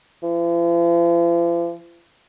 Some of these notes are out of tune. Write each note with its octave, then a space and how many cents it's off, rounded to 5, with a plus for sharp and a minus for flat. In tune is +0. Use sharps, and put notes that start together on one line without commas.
F3 -45